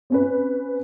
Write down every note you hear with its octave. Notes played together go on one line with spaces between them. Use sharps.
C4 C#4 B4